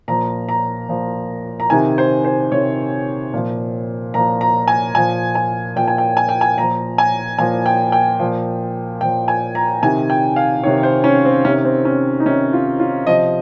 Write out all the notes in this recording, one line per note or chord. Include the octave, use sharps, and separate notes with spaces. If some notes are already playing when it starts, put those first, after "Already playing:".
A#2 F3 A#5
A#5
A#2 F3
A#5
C3 D#3 G#5
C5
C5
C3 D#3 C#5
A#2 F3
A#2 F3 A#5
A#5
G#5
A#2 F3 G#5
G#5
A#2 F3 G5
G#5
G5
G#5
G5
G#5
A#2 F3 A#5
G#5
A#2 F3 G#5
G5
G5
A#2 F3
A#2 F3 G5
G#5
A#5
C3 D#3 G#5
G5
F5
C3 D#3 C#5
C5
C#4
C4
C3 D#3 C#4
C4
C#4
D#4
C3 D#3 C#4
F4
F4
C3 F3 D#5